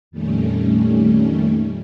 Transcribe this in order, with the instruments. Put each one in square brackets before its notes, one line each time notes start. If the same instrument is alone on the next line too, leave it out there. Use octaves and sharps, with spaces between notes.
[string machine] F2 A#2 D#3 G3 A3 C#4